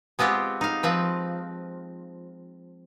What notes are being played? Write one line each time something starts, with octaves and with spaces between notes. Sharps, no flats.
G#3 B3 C4 F4 G4
D#4 F5
F3 C4 B4